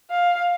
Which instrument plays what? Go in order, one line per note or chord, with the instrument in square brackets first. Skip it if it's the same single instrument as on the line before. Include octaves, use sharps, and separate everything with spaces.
[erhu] F5